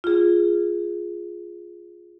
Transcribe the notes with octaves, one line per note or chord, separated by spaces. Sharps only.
F4 G#4